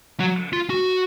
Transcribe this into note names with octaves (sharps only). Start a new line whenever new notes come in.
F#3
F4
F#4